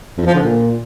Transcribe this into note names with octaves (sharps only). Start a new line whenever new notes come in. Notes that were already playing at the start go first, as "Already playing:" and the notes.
F2
F3
D3
A#2